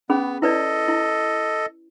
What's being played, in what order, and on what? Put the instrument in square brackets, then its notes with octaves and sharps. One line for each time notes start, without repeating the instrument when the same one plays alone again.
[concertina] B3 [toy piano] C#4 G#4 B5
[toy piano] E4 B4 D5 [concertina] A4 D#5
[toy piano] E4